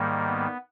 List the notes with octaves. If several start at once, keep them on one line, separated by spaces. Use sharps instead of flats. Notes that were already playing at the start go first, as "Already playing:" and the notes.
Already playing: G#2 D#3 G3 A#3
B3